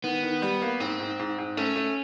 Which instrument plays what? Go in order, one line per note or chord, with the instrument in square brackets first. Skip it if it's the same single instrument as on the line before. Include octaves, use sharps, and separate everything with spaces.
[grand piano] D#3 [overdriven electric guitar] B3
[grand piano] D#3
G3
A#3
[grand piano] G#2 [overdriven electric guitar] C4
[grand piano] G#2
G#2
G#2
[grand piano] A3 [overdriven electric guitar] C#4
[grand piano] A3